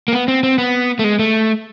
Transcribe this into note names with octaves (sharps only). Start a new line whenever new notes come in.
A#3
B3
C4
C4
B3
A3
G#3
A3